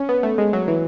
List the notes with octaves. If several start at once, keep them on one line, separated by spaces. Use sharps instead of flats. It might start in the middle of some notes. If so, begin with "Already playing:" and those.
Already playing: C#4
B3
A3
G#3
F#3
E3